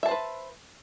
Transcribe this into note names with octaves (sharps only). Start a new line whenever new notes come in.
B4 C5 E5 A5